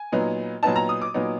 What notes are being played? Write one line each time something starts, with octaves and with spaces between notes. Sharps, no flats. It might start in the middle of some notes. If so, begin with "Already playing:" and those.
Already playing: G#5
A#2 F#3 B3 D#4
A#2 F#3 B3 D#4 A5
A#5
D#6
D6
A#2 F#3 B3 D#4